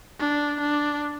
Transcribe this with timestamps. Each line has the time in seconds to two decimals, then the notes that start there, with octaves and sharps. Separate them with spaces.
0.20 D4
0.61 D4